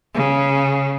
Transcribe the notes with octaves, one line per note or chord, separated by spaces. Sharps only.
C#3